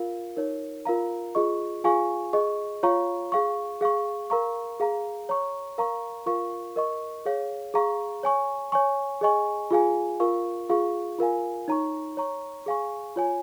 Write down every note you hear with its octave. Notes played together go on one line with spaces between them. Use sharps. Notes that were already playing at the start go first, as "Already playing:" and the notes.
Already playing: F4 A#4 F5
D#4 A#4 C#5
F4 A#4 F5 A#5
F4 G#4 D#5 C#6
F4 G#4 F5 G#5 C#6
G#4 D#5 C#6
F4 C#5 F5 A#5 C#6
G#4 F5 C#6
G#4 F5 C#6
A#4 F5 A#5 C#6
G#4 F5 A#5
C#5 A#5 C#6
A#4 F5 A#5 C#6
F4 A#4 F5 C#6
A#4 D#5 C#6
G#4 C#5 F5
G#4 F5 A#5 C#6
C#5 G#5 C#6
C#5 G#5 C#6
G#4 D#5 G#5 C#6
F4 G#4 F5 G#5
F4 A#4 F5 C#6
F4 G#4 F5 C#6
F4 A#4 F5 G#5
D#4 C#5 A#5 C#6
C#5 A#5 C#6
G#4 F5 G#5 C#6
F4 C#5 G#5